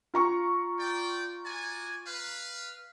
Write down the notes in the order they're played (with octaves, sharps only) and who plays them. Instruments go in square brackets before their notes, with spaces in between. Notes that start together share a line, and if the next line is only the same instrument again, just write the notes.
[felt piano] F4 A#5 C#6
[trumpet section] D5 G5
F#4 D5 G#5
B4 F5